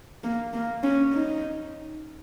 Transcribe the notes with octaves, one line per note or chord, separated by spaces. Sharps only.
A#3
A#3
C#4
D#4